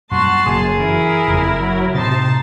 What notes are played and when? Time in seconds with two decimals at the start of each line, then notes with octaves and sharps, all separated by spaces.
0.11 F#2 A#2 G3 F#4 A5 C6
0.46 F#1 F#2 A#3 G#4
0.79 E3 E4 A#4
1.28 F#1 F2
1.60 F#3
1.95 A2 C3 D#4 A5 C6